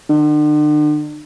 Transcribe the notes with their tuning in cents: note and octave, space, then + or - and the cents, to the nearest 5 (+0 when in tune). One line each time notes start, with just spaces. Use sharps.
D3 +40